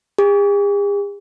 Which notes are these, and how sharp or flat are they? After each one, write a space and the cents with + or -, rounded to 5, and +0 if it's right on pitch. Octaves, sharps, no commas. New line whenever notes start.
G#4 -45